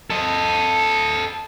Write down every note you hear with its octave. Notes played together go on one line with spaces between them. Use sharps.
A4 D#5